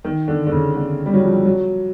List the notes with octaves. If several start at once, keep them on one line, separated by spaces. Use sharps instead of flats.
D#3
D3
D3
C#3
D3
G3
F#3
F3
F#3